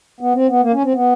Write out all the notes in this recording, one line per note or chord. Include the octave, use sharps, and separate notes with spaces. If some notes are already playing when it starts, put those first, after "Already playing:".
B3
C4
B3
A#3
C#4
C4
B3